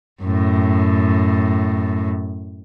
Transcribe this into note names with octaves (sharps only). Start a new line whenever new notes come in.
F#2 A2